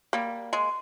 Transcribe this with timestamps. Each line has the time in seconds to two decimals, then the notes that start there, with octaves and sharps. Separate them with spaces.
0.13 G3 A#3
0.53 G#3